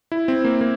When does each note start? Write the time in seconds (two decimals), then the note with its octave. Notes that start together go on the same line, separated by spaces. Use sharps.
0.12 E4
0.28 C4
0.45 A#3
0.61 A#3